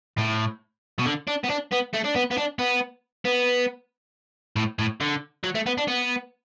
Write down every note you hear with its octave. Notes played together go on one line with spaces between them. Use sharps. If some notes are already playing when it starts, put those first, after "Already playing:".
A2
B2
D3
D4
B3
D4
B3
A3
D4
B3
B3
D4
B3
B3
A2
A2
D3
F#3
A3
B3
D4
B3